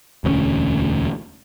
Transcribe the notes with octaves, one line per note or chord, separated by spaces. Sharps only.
E1 D2 A3 C#4